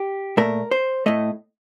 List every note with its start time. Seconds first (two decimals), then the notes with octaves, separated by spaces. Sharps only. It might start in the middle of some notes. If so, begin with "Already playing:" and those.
Already playing: G4
0.37 A#2 A3 A#4
0.71 C5
1.06 A2 A3 D#5